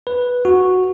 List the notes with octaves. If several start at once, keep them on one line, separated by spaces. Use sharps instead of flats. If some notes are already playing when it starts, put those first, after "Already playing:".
B4
F#4